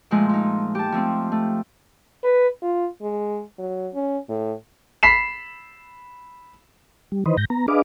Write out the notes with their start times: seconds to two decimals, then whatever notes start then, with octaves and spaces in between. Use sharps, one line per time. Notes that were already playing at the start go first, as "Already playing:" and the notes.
0.11 A#2 F3 G#3 A3
0.29 F3 D#4
0.75 G4 A5
0.92 F3 A3 C4
1.32 A3
2.24 B4
2.62 F4
3.02 G#3
3.58 F#3
3.94 C#4
4.29 A2
5.03 B5 B6 C7 E7
7.12 G3
7.26 D#3 E3 B4 C5 D#5
7.37 G#2 G6 A#6
7.50 B3 A#5
7.68 D4 G#4 B4 D#5 F5 D6